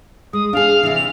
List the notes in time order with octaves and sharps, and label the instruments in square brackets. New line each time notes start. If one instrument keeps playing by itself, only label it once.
[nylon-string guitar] G#3 [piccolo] D#6
[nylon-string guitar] D4 G#4 [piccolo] F5
[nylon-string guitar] C3 E3
[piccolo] F7